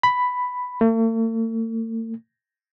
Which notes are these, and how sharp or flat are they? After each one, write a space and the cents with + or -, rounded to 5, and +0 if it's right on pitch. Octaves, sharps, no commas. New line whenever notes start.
B5 +5
A3 +45